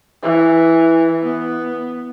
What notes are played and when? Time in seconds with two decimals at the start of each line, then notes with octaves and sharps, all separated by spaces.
0.23 E3
1.23 B3